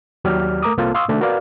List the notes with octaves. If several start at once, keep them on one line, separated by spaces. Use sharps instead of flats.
D#2 F#3 G4 D5 F6
A3 A#4 A#5 D6 D#6
C2 A#3 C4 F4 A4 A5
F5 C6 C#6 D#6 E6
C3 D#3 A3 D4
F#4 A#4 B4 D5 F5